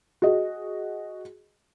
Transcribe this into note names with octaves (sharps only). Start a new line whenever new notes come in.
F#4 G#4 D#5